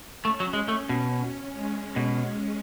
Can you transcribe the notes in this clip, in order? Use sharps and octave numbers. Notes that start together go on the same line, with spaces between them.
A3 C#4
F#3
G#3
A3
B2
G#3
B2